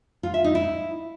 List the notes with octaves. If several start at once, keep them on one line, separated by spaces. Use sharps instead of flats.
F4
E5
D#4
E4